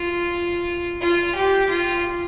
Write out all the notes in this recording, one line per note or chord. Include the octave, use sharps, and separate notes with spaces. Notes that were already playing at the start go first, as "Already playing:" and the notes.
Already playing: F4
F4
G4
F4